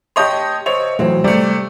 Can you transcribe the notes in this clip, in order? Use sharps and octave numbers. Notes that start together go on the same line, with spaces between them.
G4 C#5 D#5 A5 C6 G6
C5 C#5 D#5 E5
A2 E3 F#3 C4
C3 G3 A3 D5